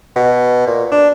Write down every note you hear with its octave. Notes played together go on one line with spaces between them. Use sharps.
B2
A#2
D4